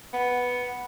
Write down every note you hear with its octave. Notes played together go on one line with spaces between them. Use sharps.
B3